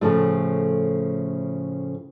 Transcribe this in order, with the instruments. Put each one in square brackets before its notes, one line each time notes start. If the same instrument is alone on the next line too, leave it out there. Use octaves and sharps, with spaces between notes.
[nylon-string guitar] A2 C#3 F3 A3